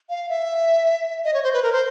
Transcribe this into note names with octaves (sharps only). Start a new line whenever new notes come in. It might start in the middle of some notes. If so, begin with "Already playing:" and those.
F5
E5
D#5
C#5
C5
B4
A#4
C5